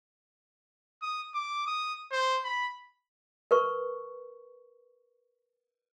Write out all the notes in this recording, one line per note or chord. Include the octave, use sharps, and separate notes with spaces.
D#6
D6
D#6
C5
B5
A#4 B4 C#6